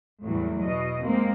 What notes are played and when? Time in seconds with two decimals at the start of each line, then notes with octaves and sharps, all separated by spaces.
0.23 E2 A2 F#3 G3
0.62 B2 D#5
1.04 G#3 A#3 C4